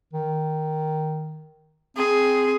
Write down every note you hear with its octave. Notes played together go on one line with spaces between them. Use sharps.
D#3
C4 G#4